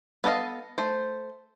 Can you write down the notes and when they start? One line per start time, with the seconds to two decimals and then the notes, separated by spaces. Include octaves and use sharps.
0.24 B3 A4 C5 D#5 F5
0.78 A3 C5